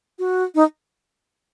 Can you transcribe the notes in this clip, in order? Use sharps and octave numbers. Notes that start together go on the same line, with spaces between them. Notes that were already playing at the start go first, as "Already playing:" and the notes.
F#4
D#4